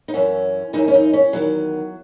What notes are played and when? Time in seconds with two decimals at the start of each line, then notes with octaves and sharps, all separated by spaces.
0.08 D#4
0.13 F#2 E3 C#4
0.73 F#2 E3 D#4
0.88 C#4
0.94 D#4
1.13 C#4
1.33 E2 D#3 F#3